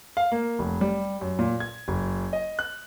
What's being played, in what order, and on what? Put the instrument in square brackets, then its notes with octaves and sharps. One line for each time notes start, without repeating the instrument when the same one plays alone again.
[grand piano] F5
A#3
F1
G3
F#2
A#2
G#6
F#1
D#5
F#6